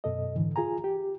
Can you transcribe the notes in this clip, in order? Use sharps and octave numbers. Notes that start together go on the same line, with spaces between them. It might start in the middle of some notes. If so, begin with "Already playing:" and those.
F#2 B2 A4 D#5
G#2 D3 E3
F4 G#4 G#5 A#5
G4